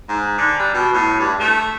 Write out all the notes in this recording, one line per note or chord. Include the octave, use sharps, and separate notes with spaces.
G#2
D3
G3
B2
A2
G2
A3